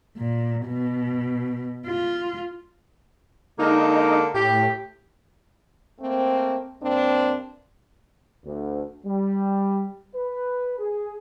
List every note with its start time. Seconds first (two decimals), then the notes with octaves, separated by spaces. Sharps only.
0.17 A#2
0.67 B2
1.87 F4
3.59 D3 G#3 A#3 D#4
4.34 A2 G4
6.00 A3 A#3 C4
6.81 G2 A#3 C4 D4
8.44 D2
9.05 G3
10.14 B4
10.78 G#4